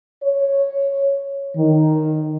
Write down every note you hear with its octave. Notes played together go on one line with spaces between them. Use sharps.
C#5
D#3